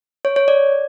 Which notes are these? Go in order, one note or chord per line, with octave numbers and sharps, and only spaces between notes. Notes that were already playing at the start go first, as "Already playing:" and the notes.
C#5
C#5
D5